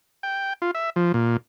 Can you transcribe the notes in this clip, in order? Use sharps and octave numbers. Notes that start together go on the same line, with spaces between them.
G5
F4
E5
F3
A#2